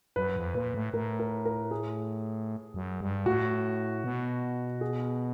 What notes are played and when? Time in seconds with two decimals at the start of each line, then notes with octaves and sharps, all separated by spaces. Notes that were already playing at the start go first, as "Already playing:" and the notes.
0.16 F#2 B4
0.36 F2
0.55 A#2 B4
0.74 A2
0.93 A2 A#4
1.20 A#4
1.45 A#4
1.71 G#4
2.74 F#2
3.01 G2
3.26 A2 F#4
4.04 B2
4.81 G#4